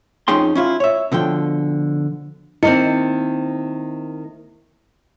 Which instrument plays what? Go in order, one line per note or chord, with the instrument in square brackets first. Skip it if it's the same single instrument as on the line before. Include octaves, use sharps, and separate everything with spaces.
[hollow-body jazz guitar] F2 C#4 D#4 G#4 G5 C6
C#4 E4 F4
C#5 E5
B2 D3 F3 G5
[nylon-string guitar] D#3 A#3 C4 [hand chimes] E4 [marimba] D#5